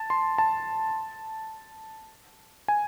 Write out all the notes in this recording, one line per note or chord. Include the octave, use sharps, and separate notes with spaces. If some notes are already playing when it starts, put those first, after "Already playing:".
Already playing: A5
C6
A5
G#5